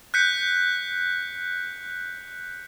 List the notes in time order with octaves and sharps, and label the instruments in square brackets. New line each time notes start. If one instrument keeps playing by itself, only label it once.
[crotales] F#6 G6 B6 C#7